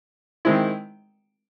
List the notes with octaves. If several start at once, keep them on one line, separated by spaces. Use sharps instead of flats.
D#3 G#3 C4 E4